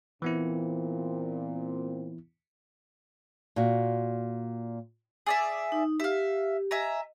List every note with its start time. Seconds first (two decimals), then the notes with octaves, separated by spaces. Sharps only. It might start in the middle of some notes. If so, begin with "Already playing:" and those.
0.22 A#2 E3 B3 C4 E4
3.56 A#2 F#4
5.27 G#4 D5 E5 E6
5.72 D#4
6.00 G4 E5 F5
6.71 D#5 E5 G#5 A#5